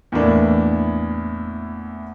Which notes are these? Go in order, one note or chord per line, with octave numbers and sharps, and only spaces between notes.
E2 A2 A#3 D4